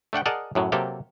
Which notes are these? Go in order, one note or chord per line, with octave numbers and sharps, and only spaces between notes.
A3 D4 F#5 G5
G#4 A#4 D5 D#5 F#5 A5
F#2 A2 F#3
C3 F#3 A#3 G4 A4